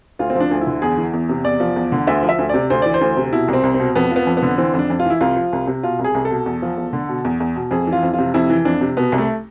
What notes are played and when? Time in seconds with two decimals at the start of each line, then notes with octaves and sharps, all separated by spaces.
0.19 D2 F4
0.30 C4
0.35 F3 D4
0.51 D2
0.61 E4
0.67 D3
0.82 E2 G#4
0.97 E3
1.13 E2
1.29 C3
1.45 E2 D5
1.60 F3
1.76 E2
1.92 D3
2.07 D2 E5
2.23 F3
2.29 E5
2.39 D2
2.49 C3 D5
2.70 D2 C5
2.82 E3 D5
2.94 C5
3.01 D2
3.17 C3
3.33 B2 E4
3.48 C2
3.53 C4
3.63 C2
3.74 C4
3.80 B2
3.95 F2 B3
4.11 F3 B3
4.27 F2
4.37 B3
4.43 D3
4.58 E3 C4
4.74 F2
4.79 D4
4.90 F2
5.00 F4
5.05 E3 E4
5.21 C2 F4
5.36 F3
5.53 C2
5.67 C3
5.83 B2 F4
5.99 C2
6.04 G#4
6.14 C2
6.25 A4
6.30 B2
6.46 E2
6.62 F3
6.77 E2
6.93 D3
7.09 B2
7.25 E2
7.40 E2
7.56 B2
7.71 F2 G#4
7.87 E3
7.92 F4
8.03 F2
8.13 F4
8.19 C3
8.34 F2 E4
8.50 E3
8.65 F2 D4
8.81 C3
8.97 B2 B3
9.12 C2
9.18 A3